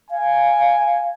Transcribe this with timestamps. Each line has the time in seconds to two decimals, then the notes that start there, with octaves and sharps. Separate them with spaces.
0.10 F5 G#5